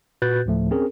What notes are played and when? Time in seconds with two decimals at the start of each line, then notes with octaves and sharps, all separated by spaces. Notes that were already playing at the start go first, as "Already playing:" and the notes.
0.22 A#2 F#4 B4 F#6 G6 A6
0.46 D2 A2 F3 A3
0.71 C4 C#4 G#4 A#4